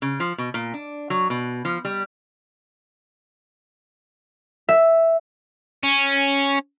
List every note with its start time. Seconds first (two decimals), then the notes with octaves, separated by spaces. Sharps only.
0.02 C#3
0.20 F3
0.38 B2
0.54 A#2
0.74 D4
1.10 F#3
1.30 B2
1.65 F3
1.85 G3
4.69 E5
5.84 C#4